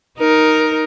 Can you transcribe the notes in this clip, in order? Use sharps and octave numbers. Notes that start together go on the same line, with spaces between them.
D#4 A#4